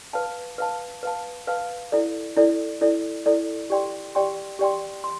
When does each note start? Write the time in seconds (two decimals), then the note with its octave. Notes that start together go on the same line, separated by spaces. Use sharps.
0.13 B4 F5 A5
0.58 B4 F5 A5
1.03 B4 F5 A5
1.47 B4 F5 A5
1.92 E4 A4 D5
2.36 E4 A4 D5
2.81 E4 A4 D5
3.26 E4 A4 D5
3.70 G4 D5 G5 C6
4.15 G4 D5 G5 C6
4.59 G4 D5 G5 C6
5.04 C6